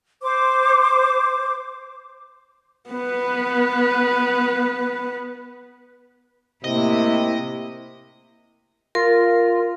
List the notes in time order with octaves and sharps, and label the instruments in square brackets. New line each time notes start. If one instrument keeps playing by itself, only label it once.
[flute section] C5 D6
[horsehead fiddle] B3 B4
[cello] A2 E4 [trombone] C3 [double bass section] A#3 [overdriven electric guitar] D#5
[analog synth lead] F4 [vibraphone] A#4